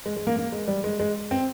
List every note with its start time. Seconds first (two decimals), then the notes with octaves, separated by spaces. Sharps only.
0.06 G#3
0.16 G#3
0.27 A#3
0.37 A#3
0.52 G#3
0.68 G3
0.84 G#3
1.00 G#3
1.31 C4